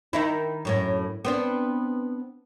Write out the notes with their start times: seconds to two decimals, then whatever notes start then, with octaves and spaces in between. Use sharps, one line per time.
0.13 D#3 D#4 E4
0.65 F#2 A2 C#4
1.25 B3 C4 D4